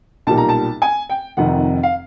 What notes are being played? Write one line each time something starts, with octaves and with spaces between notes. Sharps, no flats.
B1 A#2 G3 A5
A#5
A5
G#5
G5
F1 F2 C3 D#3 F#5
F5